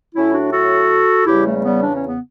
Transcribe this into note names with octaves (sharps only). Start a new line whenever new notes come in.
A2 F#3 C#4 E4
D4 F#4
F#4 A4
E2 C#3 G3 E4 G4
A3
A3
G3 B3
D4
C#4
B3